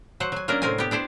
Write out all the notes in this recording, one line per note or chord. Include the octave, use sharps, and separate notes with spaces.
F#3 C5 F#5
F#3 G#5
F#3 A#3 C#4 D4 A#4
A2 C3 C4 A#4 C5 G#5
B3 G4
D4 E4 C5 D5